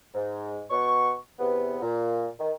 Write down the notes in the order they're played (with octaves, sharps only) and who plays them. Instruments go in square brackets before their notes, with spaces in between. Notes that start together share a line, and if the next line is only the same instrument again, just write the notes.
[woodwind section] G#2
B2 F#5 C#6
E2 C3 B3
A#2
D#3